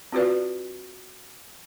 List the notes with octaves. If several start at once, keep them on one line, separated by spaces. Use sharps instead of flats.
C4 F4 F#4 B4 D5